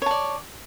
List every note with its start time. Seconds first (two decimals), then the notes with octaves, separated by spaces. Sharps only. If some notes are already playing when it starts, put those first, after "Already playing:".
0.02 C#5
0.06 A5
0.11 D5